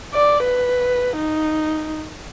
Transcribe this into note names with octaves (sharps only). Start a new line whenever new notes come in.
D5
B4
D#4